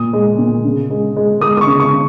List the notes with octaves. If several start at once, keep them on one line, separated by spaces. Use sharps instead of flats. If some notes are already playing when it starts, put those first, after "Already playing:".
Already playing: A#2 D#6
G#3
A#2
C#3
G#3
G#3
G#3 D#6
D#6
C#6
C#3
C#6
C#3